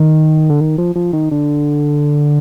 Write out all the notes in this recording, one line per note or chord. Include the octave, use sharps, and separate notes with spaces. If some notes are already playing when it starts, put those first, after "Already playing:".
Already playing: D#3
D3
D#3
F3
F3
D#3
D3